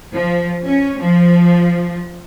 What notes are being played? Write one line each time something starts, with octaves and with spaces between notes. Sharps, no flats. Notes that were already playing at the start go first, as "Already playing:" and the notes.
F3
C#4
F3